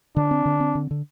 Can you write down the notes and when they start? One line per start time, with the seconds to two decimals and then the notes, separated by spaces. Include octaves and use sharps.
0.16 D3 D4
0.31 C4
0.45 D3
0.60 C4
0.75 D3
0.91 D3